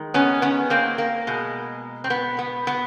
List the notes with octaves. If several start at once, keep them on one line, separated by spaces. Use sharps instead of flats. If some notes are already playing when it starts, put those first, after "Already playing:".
Already playing: D#3 G#3
B3 C#4
B3 C#4
A#3 C4
A#3
B2 G#3
C4
B3
B3
B3